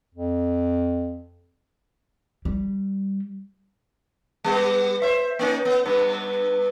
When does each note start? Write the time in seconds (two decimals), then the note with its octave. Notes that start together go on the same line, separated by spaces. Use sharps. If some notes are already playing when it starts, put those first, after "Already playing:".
0.14 F2
2.45 G3
4.44 G3 B3
5.02 C5 E5
5.39 A#3 C#4 D#4
5.65 B3
5.85 G2 B3